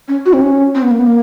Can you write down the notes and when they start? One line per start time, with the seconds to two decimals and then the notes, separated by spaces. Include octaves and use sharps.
0.08 C#4
0.26 F#4
0.33 C4
0.41 C#4
0.75 C4
0.83 B3
0.91 A#3
0.99 B3
1.07 A#3